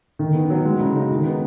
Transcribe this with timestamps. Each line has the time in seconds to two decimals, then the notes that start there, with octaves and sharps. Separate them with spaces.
0.19 D#3
0.34 B3
0.50 F#3
0.65 G#3
0.80 C#3
0.95 D#4
1.11 D#3
1.25 B3